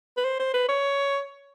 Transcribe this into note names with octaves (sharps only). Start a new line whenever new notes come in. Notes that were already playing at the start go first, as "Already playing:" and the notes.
B4
C5
C5
B4
C#5